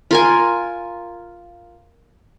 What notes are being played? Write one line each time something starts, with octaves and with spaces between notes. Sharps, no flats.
F4 A#4 G#5